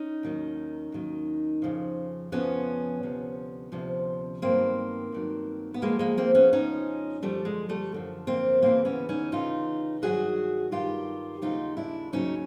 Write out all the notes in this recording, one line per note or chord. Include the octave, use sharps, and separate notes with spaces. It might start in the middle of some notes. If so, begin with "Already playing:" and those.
Already playing: C#4 D#4
D#2 D#3 F#3
D#2 D#3 F#3
F2 C#3 F3
F2 C#3 F3 B3 C#4
D2 C3 F3
D2 C3 F3
G2 D#3 F#3 A#3 C4
G2 D#3 F#3
B3
F2 C#3 F3 G#3 A#3
G#3 A#3
A#3 C4
B3 C#4
F2 C#3 F3 C#4 D#4
F#2 D3 F3 G3 A3
G#3
G3 A3
F#2 D3 F3
A#3 C4
D2 C#3 E3 A#3 C4
B3 C#4
C#4 D#4
D2 C#3 E3 D#4 F4
G2 D#3 F#3 F#4 G#4
G2 D#3 F#3 F4 G4
D#2 C#3 F#3 D#4 F4
D4 E4
D#2 C#3 F#3 C#4 D#4